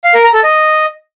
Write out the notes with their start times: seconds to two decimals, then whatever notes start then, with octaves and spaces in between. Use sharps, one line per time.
0.04 F5
0.14 A#4
0.24 A#5
0.34 A4
0.44 D#5